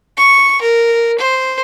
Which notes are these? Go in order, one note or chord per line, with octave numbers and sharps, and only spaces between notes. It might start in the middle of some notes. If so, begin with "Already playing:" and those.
C#6
A#4
C5